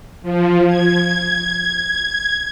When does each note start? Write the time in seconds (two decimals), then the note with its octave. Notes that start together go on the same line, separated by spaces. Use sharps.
0.22 F3
0.67 G#6